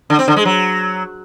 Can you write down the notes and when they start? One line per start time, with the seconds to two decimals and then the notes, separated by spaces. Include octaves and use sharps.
0.10 D3
0.19 C4
0.28 D3
0.37 G#3
0.45 F#3